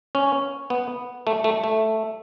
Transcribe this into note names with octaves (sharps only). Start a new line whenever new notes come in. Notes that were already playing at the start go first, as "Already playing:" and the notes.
C#4
B3
A3
A3
A3